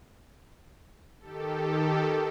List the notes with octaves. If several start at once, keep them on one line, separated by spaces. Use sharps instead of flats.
D#3 G4 A4